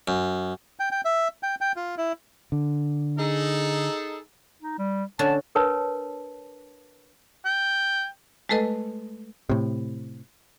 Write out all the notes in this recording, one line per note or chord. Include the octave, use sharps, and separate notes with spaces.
F#2
G5
G5
E5
G5
G5
F4
E4
D3
D#4 G#4 A4
D#4
G3
D3 C#4 A5
D4 A#4 B4 C#5 A5
G5
G#3 A3 A4 B4 D#5
A2 C3